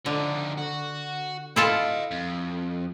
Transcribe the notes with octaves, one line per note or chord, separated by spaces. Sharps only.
D3 F3 D#4
F#4
E4 F4 A4 D#5 A5
F2